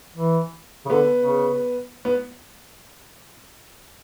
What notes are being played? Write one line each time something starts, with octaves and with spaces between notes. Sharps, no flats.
E3
C#3
D3 B3
C#3
B3